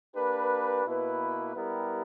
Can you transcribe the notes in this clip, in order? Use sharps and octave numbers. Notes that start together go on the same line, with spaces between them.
A#3 D4 G4 B4
B2 A#3 E4 B4
G3 B3 E4 G4 A#4